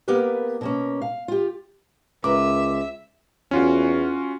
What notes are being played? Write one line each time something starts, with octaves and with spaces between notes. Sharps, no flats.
A#3 B3 G4 A#4 B4
B2 A#3 C#4
F5
F4 G4
C#2 A#4 B4 E5 D6
E2 C#4 F4 F#4